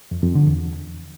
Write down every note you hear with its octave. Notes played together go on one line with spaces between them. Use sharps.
F2
F2
D3
E2